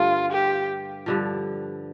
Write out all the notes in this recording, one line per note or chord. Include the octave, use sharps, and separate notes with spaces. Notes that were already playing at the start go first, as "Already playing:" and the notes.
Already playing: G2 D3 A3 F4
G4
G2 D3 F3